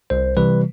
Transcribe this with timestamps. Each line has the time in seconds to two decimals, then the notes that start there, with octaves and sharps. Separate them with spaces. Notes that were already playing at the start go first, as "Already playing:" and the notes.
0.10 C2 C5
0.37 C3 E3 G3 B4